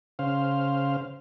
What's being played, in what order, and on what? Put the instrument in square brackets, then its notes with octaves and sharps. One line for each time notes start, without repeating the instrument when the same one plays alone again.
[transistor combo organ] C#3 C5 F5